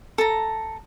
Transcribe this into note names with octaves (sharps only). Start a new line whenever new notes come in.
A4 A#5